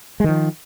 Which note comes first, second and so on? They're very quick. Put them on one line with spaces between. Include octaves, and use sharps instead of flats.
G#3 D#3 F3